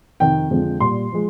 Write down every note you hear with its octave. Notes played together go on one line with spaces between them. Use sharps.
F2 C3 D#3 G5
F2 D3 F3 G#3
A#2 G3 C6
F3 G#3